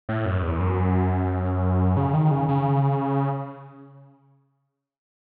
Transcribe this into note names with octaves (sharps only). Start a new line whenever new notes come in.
A2
F#2
E2
F#2
C#3
D#3
C#3
C#3